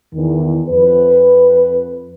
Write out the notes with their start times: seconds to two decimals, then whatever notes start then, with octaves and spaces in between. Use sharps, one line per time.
0.14 E2 D#3
0.69 F2 B4